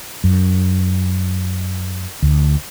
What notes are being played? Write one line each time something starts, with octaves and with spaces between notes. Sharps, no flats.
F#2
D2